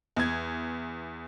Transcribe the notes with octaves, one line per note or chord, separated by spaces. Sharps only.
E2 G#6